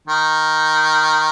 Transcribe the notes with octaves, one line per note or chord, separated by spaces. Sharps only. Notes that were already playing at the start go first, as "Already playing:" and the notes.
D#3